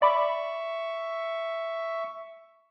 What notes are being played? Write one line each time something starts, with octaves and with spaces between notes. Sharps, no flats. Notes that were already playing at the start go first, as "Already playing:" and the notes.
D5 E5 B5 C#6 D6